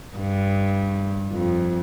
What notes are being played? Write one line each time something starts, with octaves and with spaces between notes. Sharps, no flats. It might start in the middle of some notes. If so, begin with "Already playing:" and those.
G2
F2